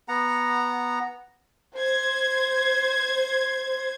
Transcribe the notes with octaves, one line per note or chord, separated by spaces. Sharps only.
B3 F#5 A#5
C5 G#6